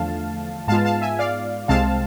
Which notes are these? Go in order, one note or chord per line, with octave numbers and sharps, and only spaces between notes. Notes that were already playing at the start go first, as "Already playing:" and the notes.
Already playing: E2 D3 F3 A3 F5 A5
G#2 G#3 B3 F4 F5 A5
F5 A5
E5 G#5
D5 F5
C2 C3 G#3 C4 F5 A5